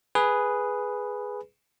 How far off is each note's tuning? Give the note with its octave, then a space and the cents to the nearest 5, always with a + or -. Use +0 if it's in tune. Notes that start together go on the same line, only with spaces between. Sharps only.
G#4 +0 B4 +0